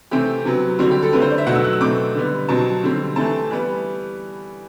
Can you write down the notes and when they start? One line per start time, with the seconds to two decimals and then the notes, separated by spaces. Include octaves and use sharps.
0.11 C3 E3 A3 C4 G4
0.45 C3 F#3 B3
0.79 D3 G3 C4 F#4
0.91 G4
1.02 A4
1.13 D3 A3 C4 B4
1.21 C5
1.31 D5
1.38 E5
1.46 B2 F#3 A3 F#5
1.55 E6
1.65 F#6
1.73 E6
1.81 B2 A3 C4 D6
2.15 D3 G3 B3
2.49 B2 F#3 C4 A5
2.83 D3 G3 C4
3.16 E3 A3 C4 A5
3.51 E3 G3 B3